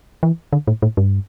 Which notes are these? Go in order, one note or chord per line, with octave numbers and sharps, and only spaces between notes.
E3
D3
A2
A2
G2